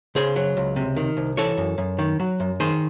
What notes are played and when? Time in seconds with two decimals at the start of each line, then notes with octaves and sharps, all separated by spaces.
0.15 C#3 G#4 C5
0.36 F#3
0.57 C#2
0.76 C3
0.96 D#3
1.17 C2
1.37 E3 A4 C#5
1.57 F#2
1.78 F#2
1.98 D#3
2.20 F#3
2.40 F#2
2.60 D#3 G#4 C5